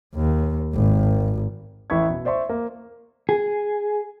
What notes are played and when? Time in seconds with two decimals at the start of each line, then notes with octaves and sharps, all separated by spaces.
0.16 D#2
0.75 G#1
1.90 A1 E4 E5 B5 C#6 G#6
2.10 B2
2.25 C5 D5 E5 C6 C#6
2.49 A#3
3.29 G#4